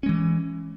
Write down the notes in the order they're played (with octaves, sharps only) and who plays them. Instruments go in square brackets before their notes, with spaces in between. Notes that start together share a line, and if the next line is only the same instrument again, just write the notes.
[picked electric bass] C#4
G#3
E3